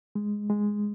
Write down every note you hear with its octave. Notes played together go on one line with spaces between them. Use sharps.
G#3
G#3